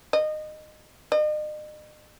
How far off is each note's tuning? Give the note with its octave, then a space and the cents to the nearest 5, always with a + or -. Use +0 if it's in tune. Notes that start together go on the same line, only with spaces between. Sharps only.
D#5 -20
D#5 -40